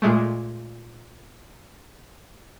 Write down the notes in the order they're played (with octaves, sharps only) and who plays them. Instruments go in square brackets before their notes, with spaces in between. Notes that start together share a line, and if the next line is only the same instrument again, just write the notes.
[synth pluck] A#2 G#3 A3